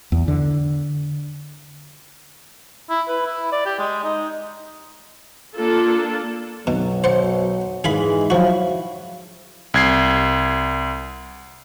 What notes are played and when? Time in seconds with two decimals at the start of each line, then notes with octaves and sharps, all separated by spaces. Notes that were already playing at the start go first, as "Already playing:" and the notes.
0.12 E2
0.28 D3
2.90 E4
3.08 B4
3.26 E4
3.52 D5
3.66 G4
3.79 G#3
4.04 D#4
5.56 A#3 D4 F4 A4 A5
6.67 B1 B2 F#3
7.04 C5 F#5
7.84 G#2 E3 G#3 G#4 F5 B5
8.30 F3 F#3 E4 F#4 F5
9.74 C2 G#6 C7